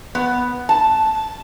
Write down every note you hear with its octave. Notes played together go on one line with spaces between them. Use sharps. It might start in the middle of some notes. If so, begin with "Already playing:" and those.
B3
A5